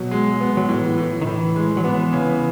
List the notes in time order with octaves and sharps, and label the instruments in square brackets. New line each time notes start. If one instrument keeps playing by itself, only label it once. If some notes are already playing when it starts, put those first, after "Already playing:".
Already playing: [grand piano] B2 [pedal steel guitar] F#3
[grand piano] G#3
B3
[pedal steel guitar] F#3
[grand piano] A2 [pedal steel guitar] E3
[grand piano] A2
[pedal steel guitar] D#3
[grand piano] A2 [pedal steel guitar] E3
[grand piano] G#3
[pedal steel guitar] F#3
[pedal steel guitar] E3 [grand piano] B3
[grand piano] C#3